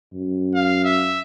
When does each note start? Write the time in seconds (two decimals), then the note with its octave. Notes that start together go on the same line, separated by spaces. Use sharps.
0.13 F#2
0.55 F5
0.85 E5